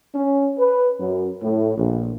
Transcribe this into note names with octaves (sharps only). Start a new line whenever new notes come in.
C#4
B4
F#2
A2
A#1